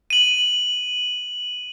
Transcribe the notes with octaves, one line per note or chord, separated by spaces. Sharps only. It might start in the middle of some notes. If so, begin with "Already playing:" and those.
D#7 F#7